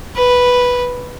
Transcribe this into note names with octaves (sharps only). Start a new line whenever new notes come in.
B4